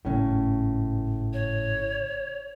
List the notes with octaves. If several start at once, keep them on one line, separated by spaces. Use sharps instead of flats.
G#1 A2 C#3 C#4
C#5